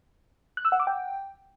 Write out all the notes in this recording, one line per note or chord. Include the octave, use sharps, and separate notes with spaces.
F#6
E6
F#5
D6
G5